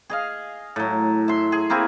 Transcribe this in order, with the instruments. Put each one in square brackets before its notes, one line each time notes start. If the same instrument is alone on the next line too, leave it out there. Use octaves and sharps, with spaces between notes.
[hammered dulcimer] G#4 D#5 F5
A2 F#3
E5 C6
G#4
A#3 C4 E4 G#4